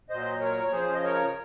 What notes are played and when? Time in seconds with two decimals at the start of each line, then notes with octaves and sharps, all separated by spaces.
0.10 A#2 F#3 C5 D#5
0.41 A#4 C#5
0.63 C#5
0.72 C#3 F3 G#4 C5
0.94 D#5
1.04 A#4 C#5